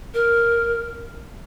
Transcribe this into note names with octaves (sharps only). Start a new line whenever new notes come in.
A#4